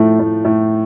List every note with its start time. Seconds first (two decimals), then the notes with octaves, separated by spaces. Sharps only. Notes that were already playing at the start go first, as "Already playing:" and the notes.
Already playing: A2 F3 A3
0.20 A2
0.45 A2